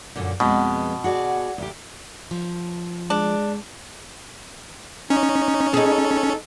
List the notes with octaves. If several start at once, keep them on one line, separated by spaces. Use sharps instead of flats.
F#2 A#2 D3
F2 B2 G#3 B3
F#4 G#4 D5
D2 G4
F3
G#3 D4
C#4 D#4
D#4 G#4 A4